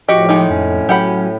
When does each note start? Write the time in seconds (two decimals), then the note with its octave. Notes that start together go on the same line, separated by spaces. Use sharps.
0.09 A2 F3 F#4 G4 D#5
0.29 D#3 G#3 D#4
0.50 F2 C#4
0.89 F#3 G4 F#5 B5